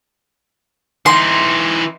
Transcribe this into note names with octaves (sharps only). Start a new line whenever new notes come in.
E3 D#4 C6